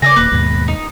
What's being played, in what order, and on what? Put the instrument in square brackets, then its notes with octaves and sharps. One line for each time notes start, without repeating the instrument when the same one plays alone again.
[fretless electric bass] C#3 [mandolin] D5 E5 G#5 [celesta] A#6
[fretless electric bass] D#1 A#3 [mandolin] B4
[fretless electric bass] D#2 G#2 B2
[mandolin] D#4